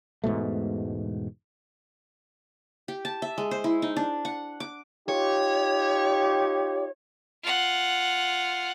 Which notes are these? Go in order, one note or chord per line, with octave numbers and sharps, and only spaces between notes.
E1 G#2 B2 A3
G4
A5
E5
G#3
C5
E4
D#4
D4
F#5
D6
D#4 F4 G4 C#5
F4 F#5